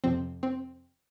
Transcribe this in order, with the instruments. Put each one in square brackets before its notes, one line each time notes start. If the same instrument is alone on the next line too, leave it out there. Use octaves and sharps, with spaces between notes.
[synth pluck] F2 C3 F3 C4
C4